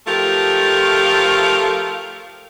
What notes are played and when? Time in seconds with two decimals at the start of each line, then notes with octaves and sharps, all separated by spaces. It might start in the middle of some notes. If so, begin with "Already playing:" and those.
0.07 F3 A3 F4 G4 A4 A#4